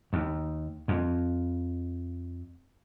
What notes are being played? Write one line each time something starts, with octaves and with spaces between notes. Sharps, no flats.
D#2
F2